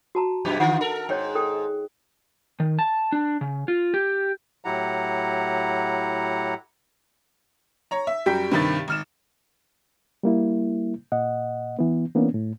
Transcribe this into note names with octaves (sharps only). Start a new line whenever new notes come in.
F#4 A5 A#5
F#2 B2 G4
D3 F4 F#5
A4 A#4
G#2 C#5 D5 G5
A4 G5
D#3
A5
D4
C#3
F4
G4
A2 F#3 E4 G4 F#5 A#5
C#5 A#5
E5
F#2 G3 G5 B6
G2 C3 D#3 B5 A6
G#1 F6 E7
G3 A#3 E4
A#2 D#5 F#5
E3 B3
E3 A#3 B3 C#4 D4
A2